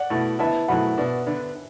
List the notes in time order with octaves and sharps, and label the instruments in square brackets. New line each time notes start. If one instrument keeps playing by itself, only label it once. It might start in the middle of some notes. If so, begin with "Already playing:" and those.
Already playing: [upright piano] D5 F#5
[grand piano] B2 A3 E4
[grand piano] D3 B3 E4 [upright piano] E5 A5
[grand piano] B2 F#3 A3 E4 [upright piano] F#5 B5
[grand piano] B2 B3 D4
D3 B3 D4